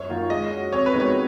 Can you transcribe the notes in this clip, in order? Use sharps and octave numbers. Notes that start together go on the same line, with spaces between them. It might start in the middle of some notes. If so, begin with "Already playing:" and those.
Already playing: F#2 C#5
D#3 A#3 F4
G#3 D#5
C#4 F#4
F2 C#5
B4
D#3 G#3 B3 F#4
C#5